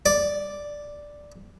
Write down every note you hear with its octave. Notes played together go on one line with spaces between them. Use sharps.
D5